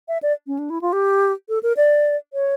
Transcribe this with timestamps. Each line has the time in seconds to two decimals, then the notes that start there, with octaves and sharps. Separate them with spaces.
0.08 E5
0.22 D5
0.47 C#4
0.59 D4
0.70 E4
0.81 F4
0.93 G4
1.49 A4
1.63 A#4
1.77 D5
2.33 C#5